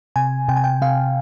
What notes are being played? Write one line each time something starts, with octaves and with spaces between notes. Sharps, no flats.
C3 G#5
C3 G5
G#5
G5
C3 F5